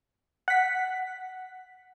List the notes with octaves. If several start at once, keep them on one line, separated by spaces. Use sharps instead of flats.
F#5 B6